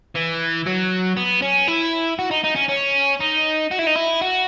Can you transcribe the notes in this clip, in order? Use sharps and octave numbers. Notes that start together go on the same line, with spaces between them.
E3
F#3
B3
C#4
E4
F#4
D#4
D#4
C#4
C#4
D#4
F#4
E4
D#4
E4
F#4